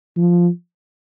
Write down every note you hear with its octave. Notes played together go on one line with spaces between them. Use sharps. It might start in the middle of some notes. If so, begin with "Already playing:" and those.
F3